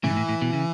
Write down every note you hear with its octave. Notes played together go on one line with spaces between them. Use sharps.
A2 C#3 E3
G#2
A2
A2
B2
C#3